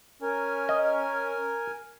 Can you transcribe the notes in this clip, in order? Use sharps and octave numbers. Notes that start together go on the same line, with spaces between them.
C#4 A#4 G#5
D#5